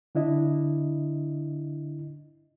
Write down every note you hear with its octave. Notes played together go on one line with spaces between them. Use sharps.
D3 D4 E4 D#5